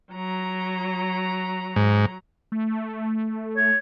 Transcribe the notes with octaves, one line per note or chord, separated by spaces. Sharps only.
F#3 A#5
G#2
A3
C#5